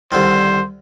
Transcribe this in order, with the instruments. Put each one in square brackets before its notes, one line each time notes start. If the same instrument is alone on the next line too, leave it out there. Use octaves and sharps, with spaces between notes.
[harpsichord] C2 D3 D#3 [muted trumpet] C5